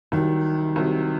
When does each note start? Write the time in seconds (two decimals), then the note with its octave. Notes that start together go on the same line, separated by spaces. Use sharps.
0.12 C2 C3 D#3 F#3
0.76 C2 C3 F#3